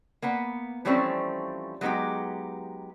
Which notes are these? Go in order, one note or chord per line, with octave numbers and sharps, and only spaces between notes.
A#3 B3 B4 F#5
E3 F3 G3 A3 C4 C#4
F#3 G#3 B3 D#4 G4